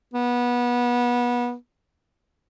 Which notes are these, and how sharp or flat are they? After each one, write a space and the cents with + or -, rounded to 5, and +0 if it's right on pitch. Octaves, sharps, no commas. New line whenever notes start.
B3 -25